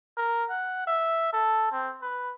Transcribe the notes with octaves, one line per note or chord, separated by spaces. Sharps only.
A#4
F#5
E5
A4
C4
B4